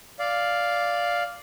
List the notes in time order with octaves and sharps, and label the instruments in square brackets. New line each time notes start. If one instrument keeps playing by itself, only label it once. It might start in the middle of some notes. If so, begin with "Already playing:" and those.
[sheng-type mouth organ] D5 F5